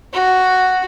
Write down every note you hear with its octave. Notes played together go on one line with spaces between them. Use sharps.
F#4